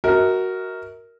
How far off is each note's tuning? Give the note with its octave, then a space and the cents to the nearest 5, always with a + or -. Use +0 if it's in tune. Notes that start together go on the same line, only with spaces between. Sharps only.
F#4 +10 A#4 +0 E5 -45